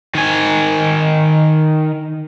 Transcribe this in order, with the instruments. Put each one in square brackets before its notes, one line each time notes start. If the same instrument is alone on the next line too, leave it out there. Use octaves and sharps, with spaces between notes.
[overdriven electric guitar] D#3 G#5